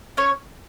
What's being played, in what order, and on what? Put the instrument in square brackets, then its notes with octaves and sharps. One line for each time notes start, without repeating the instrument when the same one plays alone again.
[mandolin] C#4 C#5